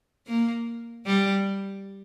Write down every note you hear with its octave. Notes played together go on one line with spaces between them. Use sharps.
A#3
G3